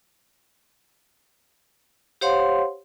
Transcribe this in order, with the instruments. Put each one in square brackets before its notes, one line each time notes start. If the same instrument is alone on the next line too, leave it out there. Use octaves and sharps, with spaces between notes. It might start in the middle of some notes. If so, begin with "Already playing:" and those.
[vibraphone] G4 C5 C#5 F5 F#5 C6